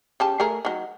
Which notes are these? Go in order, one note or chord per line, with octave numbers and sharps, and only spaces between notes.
C#3 G4 A5
A3 G#4 A#4
D#3 F#3